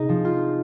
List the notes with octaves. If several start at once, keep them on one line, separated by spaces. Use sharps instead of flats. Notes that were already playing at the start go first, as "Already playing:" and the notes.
Already playing: C3 D#4 G#4
F3
F4